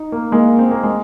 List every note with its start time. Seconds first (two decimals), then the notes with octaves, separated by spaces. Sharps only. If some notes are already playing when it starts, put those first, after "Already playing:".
Already playing: D#4
0.12 A#3
0.32 G#3 A#3
0.59 C4
0.71 A#3
0.83 G#3